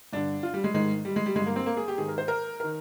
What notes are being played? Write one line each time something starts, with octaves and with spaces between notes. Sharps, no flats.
G2 D3 D4
F4
G3
G#3
G#2 D#3 G#3
G3
G#3
G3
G2 D3 G#3
A#3
C4
A#3
G#4
G4
G#2 D#3 G#4
A#4
C5
A#4
D#3 A#4